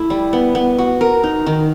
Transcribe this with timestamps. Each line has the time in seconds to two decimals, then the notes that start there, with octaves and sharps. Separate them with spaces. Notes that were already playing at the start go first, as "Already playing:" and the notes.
Already playing: A3 E4
0.10 G3
0.33 B3
0.55 B3
0.78 F#4
1.01 A#4
1.23 D#4
1.47 D#3